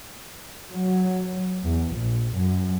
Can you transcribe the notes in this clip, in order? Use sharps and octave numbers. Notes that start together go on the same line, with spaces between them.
F#3
E2
A#1
F#2